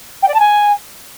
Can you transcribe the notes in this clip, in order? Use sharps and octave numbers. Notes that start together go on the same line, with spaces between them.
G5
D5
A5
G#5